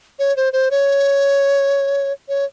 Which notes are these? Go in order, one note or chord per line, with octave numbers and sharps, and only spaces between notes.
C#5
C5
C5
C#5
C#5